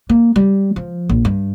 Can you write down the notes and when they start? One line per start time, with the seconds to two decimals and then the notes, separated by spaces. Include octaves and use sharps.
0.10 A#3
0.36 G3
0.76 F3
1.09 A#1
1.25 G2